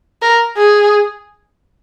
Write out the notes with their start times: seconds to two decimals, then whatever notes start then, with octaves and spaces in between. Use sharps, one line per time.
0.22 A#4
0.57 G#4